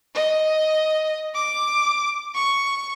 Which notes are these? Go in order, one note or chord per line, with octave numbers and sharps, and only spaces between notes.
D#5
D6
C#6